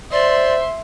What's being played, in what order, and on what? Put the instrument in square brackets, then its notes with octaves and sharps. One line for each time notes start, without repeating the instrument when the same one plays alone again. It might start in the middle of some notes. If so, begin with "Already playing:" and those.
[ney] C5 [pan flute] D5 [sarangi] E5 [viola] C6